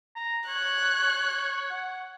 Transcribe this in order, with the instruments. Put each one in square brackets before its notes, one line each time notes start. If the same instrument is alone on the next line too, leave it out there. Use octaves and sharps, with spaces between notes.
[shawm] A#5
[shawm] C#5 [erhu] F#6
[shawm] F#5